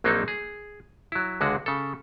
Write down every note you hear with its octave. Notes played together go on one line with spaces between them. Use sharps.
A#1 F#3 A#3 C4 D#4 A4
G#4
F#3 E4
C#2 D3 G#3 F#4
C#3 A4